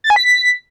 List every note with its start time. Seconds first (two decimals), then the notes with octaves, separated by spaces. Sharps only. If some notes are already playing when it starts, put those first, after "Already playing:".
0.04 A6
0.10 G#5
0.16 B6